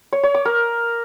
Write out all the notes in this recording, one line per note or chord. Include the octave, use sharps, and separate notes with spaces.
C#5
C#5
D6
A#4